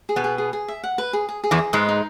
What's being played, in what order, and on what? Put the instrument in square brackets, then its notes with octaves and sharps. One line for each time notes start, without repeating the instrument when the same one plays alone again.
[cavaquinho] G#4
[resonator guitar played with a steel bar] B2 B3
[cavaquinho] G#4
G#4
G#4
E5
F#5
B4
G#4
G#4
G#4
[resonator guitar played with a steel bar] E2 E3
[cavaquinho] D#5
[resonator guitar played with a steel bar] G#2 G#3 [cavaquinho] B4
[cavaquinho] D#4